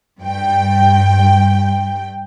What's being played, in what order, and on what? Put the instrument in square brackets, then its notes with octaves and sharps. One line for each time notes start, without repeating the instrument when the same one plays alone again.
[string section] G2 G5